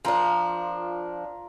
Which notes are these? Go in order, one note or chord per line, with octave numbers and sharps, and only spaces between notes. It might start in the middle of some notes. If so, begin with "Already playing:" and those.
F3 D4 F4 A#4